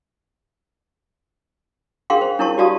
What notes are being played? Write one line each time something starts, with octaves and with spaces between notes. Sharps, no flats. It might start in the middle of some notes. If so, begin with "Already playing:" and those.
D4 G#4 A#4 F5 G5 C6
C5
D4 E4 A#4 C#5 A5 C#6
F#4 G4 D5 F5 A5 D#6